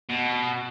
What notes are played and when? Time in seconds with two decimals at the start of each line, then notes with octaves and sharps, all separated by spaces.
0.09 B2